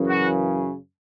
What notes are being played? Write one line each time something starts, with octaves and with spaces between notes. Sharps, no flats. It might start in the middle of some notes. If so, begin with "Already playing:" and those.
Already playing: F#2 C#3 E3
F#4